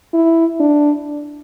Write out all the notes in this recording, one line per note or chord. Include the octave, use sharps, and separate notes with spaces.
E4
D4